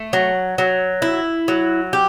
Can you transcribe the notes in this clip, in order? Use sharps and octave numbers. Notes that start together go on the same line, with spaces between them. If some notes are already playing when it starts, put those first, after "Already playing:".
Already playing: A3
F#3
F#3
E4
F#3
G4